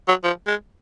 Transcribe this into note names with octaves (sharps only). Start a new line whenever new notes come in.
F#3
F3
G#3